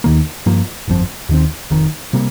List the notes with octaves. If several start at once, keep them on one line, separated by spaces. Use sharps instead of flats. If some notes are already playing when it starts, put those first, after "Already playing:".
D#2 D#3 A#3
G2 F3 A#3
G1 F2 F3 C4
D#2 D#3 C4
F1 F2 D#3
C3 G3 A#3